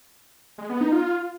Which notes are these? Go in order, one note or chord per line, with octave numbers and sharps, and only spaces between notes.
G#3
B3
D#4
F4